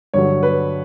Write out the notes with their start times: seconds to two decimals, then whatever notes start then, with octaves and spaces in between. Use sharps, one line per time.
0.14 G2 D3 F#3 C#5
0.43 B4